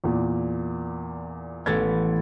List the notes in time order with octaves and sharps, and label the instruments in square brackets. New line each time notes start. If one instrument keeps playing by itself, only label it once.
[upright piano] E2 A#2
[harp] A1 A3 B3 [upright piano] G#6 A6